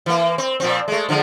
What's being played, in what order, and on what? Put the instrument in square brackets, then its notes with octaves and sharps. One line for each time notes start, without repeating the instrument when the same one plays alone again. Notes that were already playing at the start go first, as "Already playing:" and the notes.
[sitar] E3 A#3
C4
A#2 F3 C4
G#3 A3
D3 F3 G#3